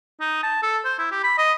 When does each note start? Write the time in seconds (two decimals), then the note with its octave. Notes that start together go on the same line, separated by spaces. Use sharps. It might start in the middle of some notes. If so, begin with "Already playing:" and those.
0.21 D#4
0.43 A5
0.63 A4
0.85 C5
0.99 E4
1.11 G4
1.24 B5
1.38 D#5